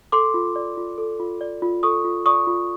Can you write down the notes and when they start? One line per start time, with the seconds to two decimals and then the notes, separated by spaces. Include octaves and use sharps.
0.12 A4 C6 D6
0.34 F4
0.56 D5
0.77 F4
0.98 A4
1.20 F4
1.41 D5
1.62 F4
1.83 A4 C#6 D#6
2.04 F4
2.26 D5 C#6 D#6
2.47 F4